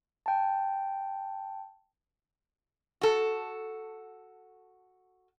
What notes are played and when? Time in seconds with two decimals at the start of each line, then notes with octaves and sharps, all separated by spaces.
0.26 G5 A5
3.01 F#4 A4